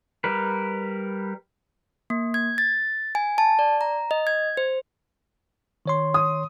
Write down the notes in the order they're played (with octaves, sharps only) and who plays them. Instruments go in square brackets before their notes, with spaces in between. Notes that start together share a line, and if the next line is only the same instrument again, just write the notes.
[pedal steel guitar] G3 A#4 B4
[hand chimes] A#3
G#6
A6
G#5
A5
D5
A#5
D#5
G#6
C5
[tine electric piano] D#3 C#5 C6
[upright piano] D#6